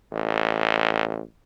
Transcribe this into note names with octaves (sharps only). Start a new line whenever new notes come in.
A1